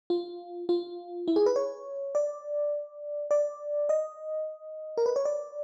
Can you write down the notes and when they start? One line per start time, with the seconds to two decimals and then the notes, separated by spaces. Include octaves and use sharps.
0.10 F4
0.69 F4
1.28 E4
1.36 G#4
1.46 B4
1.56 C#5
2.15 D5
3.31 D5
3.89 D#5
4.97 A#4
5.06 B4
5.16 C#5
5.25 D5